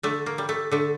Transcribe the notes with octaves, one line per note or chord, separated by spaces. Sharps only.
D3 A3
A#3
G3
A3
D3 A3